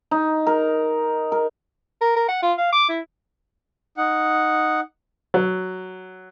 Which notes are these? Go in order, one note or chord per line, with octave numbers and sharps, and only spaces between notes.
D#4
A#4
A#4
A#4
A#4
F#5
F4
F5
D6
E4
D#4 F#5
F#3